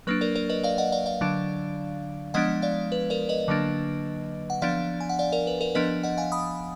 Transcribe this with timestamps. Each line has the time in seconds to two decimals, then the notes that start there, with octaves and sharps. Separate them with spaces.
0.07 F#3 A#3 D4 B4
0.21 A#4 D5
0.35 A#4 D5
0.49 B4 D#5
0.63 D5 F5
0.78 D#5 F#5
0.92 D5 F5
1.06 D5 F5
1.21 D3 F#3 D4
2.34 F3 G#3 B3 D4 D#5 F#5
2.62 D5 F5
2.92 B4
3.10 A#4 D5
3.29 B4 D#5
3.48 D3 F#3 A#3 D4
4.50 F#5
4.62 F3 B3 D4 D5 F5
5.00 G#5
5.09 F#5
5.19 D5 F5
5.32 A#4 D5
5.47 B4
5.61 A#4 D5
5.75 F3 B3 D4 B4 D#5
6.03 D#5 F#5
6.17 F5 G#5
6.32 B5 D#6